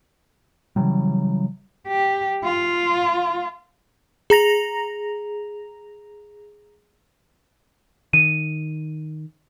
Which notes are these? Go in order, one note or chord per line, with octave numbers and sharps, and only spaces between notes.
C#3 E3 F#3 G3
G4
F4
G#4 A#5 A#6 F7
D#3 D#7